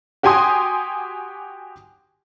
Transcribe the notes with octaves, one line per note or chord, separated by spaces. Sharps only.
F#4 G4 G5 G#5 C6 D#6